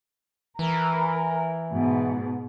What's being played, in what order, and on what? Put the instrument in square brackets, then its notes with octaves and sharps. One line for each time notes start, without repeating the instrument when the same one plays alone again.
[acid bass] E3 [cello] A#4
[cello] G#2 B2